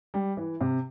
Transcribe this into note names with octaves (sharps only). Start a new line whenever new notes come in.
G3
E3
C3